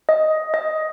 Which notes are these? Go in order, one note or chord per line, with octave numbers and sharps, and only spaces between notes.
D#5
D#5